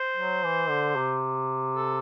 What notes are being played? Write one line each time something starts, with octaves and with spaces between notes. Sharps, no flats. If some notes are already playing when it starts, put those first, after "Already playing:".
Already playing: C5
F#3
E3
D3
C3
A4